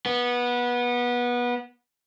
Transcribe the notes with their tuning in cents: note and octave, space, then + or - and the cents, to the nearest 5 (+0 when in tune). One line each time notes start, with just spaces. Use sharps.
B3 -20